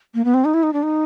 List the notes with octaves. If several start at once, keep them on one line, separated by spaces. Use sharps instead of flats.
A#3
B3
C4
D#4
E4
D#4
D4
D#4